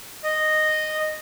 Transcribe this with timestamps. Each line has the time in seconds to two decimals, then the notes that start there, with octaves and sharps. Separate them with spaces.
0.23 D#5